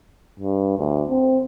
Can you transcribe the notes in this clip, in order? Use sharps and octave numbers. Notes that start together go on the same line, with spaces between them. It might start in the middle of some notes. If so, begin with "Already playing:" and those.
G2
D2
C4